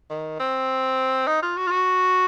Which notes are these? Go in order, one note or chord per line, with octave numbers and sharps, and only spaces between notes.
D#3
C4
D#4
F4
F#4
F4
F#4